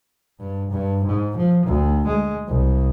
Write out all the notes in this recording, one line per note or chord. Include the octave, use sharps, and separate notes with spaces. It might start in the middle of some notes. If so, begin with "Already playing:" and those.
G2
G2
G#2
F3
D2
G#3
C2